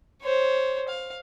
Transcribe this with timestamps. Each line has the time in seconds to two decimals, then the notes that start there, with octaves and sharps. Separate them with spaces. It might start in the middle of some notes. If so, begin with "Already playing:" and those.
0.22 C5 C#5
0.88 F5